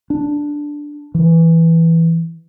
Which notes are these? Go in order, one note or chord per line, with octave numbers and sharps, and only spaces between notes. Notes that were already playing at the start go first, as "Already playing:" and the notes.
D4
E3